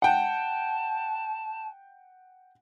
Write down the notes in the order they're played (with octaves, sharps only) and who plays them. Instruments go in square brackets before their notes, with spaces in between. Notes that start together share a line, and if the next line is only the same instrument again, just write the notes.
[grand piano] F#5 G5 [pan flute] A5